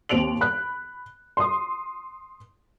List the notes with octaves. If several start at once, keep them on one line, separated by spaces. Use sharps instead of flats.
D#2 C4 D7 F7 F#7
B5 F#6
C6 D#6